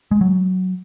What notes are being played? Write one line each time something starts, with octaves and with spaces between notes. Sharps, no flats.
G#3
F#3